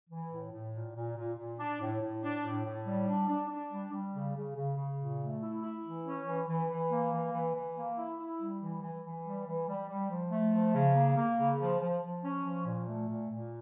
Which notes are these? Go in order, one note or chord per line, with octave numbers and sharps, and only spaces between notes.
E3
A2
A2
A#2
A#2
A#2
A#2
D4
A2
A2
D4
A2
A2
G3
D4
D4
D4
G3
G3
C#3
C#3
C#3
C#3
A#2
A3
E4
E4
E3
C#4
E3
E3
E3
A#3
E3
E3
E3
A#3
E4
E4
G3
E3
E3
E3
G3
E3
G3
G3
F3
A3
F3
C#3
A#3
A#3
C#3
F3
F3
F3
C#4
F3
A#2
A3
A#2
A#2